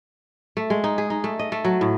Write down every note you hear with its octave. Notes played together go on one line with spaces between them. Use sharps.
A3
G#3
D#4
G#4
D#4
A3
D#5
A3
F#3
A2